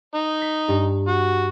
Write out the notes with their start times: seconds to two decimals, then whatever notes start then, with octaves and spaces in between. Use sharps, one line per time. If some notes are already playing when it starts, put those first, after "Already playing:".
0.15 D#4
0.42 B6
0.68 G2
1.08 F#4